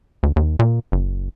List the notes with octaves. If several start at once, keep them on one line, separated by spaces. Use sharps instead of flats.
D2
D#2
A#2
F#1